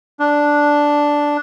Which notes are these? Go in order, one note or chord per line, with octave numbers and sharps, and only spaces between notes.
D4